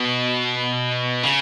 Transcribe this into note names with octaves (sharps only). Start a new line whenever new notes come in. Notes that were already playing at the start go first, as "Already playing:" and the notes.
Already playing: B2
C#3